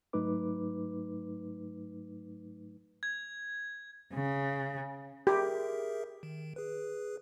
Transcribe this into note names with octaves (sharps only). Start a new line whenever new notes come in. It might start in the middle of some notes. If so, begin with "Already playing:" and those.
G#2 F#3 A3 D#4 B4 D6
G#6
C#3
G4 G#4 A#4 E5
D#3
G#4 B4